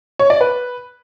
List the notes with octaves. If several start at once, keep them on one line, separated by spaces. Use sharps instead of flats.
C#5
D5
B4